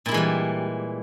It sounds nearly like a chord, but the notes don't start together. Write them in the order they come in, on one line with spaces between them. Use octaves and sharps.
A#2 E4 G#3 E3 G3